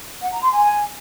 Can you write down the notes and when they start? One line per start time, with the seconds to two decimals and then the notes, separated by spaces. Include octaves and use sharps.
0.21 F#5
0.31 A#5
0.41 C6
0.51 G#5